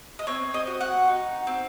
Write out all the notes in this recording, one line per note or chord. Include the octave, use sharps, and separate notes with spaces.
D#5
C4 C#5
D#5
F#4
F#5
D#4
C4